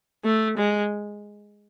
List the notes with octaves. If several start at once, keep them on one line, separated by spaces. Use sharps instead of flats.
A3
G#3